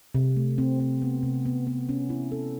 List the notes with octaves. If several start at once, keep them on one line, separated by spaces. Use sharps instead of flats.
C3
A3
C4
C4
B3
C3
B3
B3
C#4
E4
A4